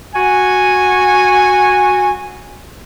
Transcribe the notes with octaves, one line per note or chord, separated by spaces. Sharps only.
F#4 G#5